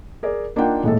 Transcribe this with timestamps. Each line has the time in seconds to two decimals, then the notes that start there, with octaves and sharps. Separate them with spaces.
0.23 G#4 A#4 D5
0.56 A#3 D4 D#4 F4 F#5 G5
0.83 D#1 A1 G#3 A4